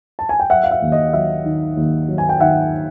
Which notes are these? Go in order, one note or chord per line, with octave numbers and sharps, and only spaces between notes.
A5
G#5
G5
F#3 E5 F#5
F5
E5
D#2
D#5
F#3 E5
D#3
D#2
F#3
G#5
G5
D#3 E5 F#5